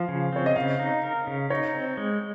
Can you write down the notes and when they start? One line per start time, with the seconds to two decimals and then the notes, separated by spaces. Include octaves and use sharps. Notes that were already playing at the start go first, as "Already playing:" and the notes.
Already playing: F3 F5
0.08 C#3
0.32 C4 C#5
0.46 D#5
0.56 C#3 F5
0.80 D#4
1.04 A#4
1.27 C#3
1.50 D#4 C#5
1.75 C4
1.97 G#3